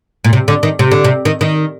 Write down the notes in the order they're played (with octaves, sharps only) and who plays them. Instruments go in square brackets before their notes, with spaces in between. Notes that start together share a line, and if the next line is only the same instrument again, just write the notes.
[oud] A#2
C3
D3
D#3
C3
D3
C3
D#3
D#3